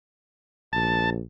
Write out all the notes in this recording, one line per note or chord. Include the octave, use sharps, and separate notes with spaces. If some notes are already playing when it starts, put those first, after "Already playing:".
A#1 A5